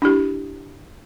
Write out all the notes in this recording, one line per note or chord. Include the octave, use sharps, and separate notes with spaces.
D4 E4 G4